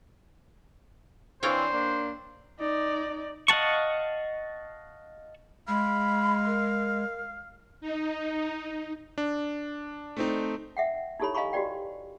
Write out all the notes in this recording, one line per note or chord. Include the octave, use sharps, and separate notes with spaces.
E3 C4 D4 C5 C#5 F5 G5
A#3 D4
D#4 D5
D#5 F5 F#5 A5 C#6
G#3 F5 B5
A#4
D#4
D4
A3 C4 D#4
E5 F#5 G5
D#4 E4 G4 A4 C#5 B5
D#5 F5 G#5 A#5 B5 C#6
F#4 G4 B4 D5 G5